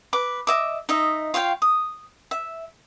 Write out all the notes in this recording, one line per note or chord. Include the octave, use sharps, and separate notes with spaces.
B4 D6
D#5 E5 D6
D#4 D#5 E5
F4 C#5 F5 G5
D#6
E5